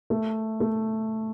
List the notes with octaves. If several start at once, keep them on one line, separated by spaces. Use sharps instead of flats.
A3
A3